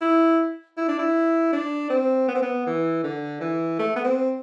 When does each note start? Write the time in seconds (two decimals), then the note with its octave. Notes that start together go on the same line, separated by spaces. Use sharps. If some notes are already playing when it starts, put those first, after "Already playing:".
0.02 E4
0.77 E4
0.88 D4
0.99 E4
1.53 D4
1.90 C4
2.28 B3
2.35 C4
2.42 B3
2.66 E3
3.04 D3
3.41 E3
3.79 A3
3.96 B3
4.04 C4